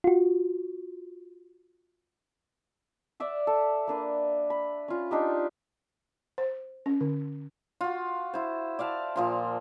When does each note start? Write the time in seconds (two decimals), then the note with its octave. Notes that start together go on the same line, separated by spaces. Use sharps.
0.04 F4 F#4
3.20 D5 E5 F#5
3.47 A4
3.87 A#3 D4 B4
4.50 B5
4.88 C#4 F4
5.11 D4 D#4 G4
6.38 C5
6.86 C#4
7.01 D3
7.81 F4 F#4
8.34 E4 C5
8.79 D5 E5 F5 A5
9.16 A#2 F3 C6